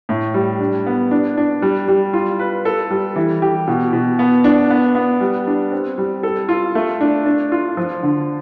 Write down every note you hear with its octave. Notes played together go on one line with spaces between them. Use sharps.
A2
G3
D4
B3
D4
D4
G3
G3
F4
B4
A4
G3
E3
G4
B2
B2
B3
D4
B3
B3
G3
D4
C4
G3
A4
F4
A3
D4
D4
F4
F3
D3